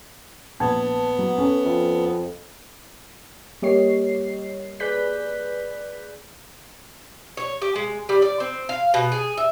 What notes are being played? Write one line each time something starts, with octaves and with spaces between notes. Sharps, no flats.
A#1 B3 A5 G#6
F#3
C#4 A4
F2
G3 A#3 G4 C#5 D#5 C7
G#4 B4 D5 F#6 G6 B6
C#5
G4
G#3
G3
D5
C4
F5
B2
G#4
E5